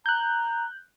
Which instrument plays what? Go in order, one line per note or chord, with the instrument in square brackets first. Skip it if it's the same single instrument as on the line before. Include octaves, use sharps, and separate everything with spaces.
[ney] A#5 [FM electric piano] F#6 G6